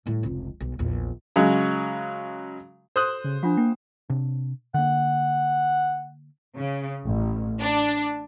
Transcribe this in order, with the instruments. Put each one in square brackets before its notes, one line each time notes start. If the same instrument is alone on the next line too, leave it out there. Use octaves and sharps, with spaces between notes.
[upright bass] A2 G3
F1 C#2
B1
A#1 E2
[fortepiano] C#3 F#3 G#3
[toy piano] F#4 A4 [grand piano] C5 D#6 F#6
[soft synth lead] C#3
[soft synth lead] F3 [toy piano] D4 F4 F#5
[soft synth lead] A#3 [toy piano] G5
[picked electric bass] C3 D4
[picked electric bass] D3 A#3 [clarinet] F#5
[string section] C#3
A1
D4